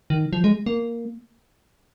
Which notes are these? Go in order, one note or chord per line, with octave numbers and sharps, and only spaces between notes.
D#3
F3
G#3
A#3